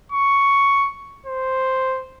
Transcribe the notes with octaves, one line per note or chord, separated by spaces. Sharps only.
C#6
C5